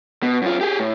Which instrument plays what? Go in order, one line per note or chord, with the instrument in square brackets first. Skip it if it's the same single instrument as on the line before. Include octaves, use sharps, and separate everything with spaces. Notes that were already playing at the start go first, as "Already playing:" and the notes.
[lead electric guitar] B2
F#2 F4
G4 G#4
A2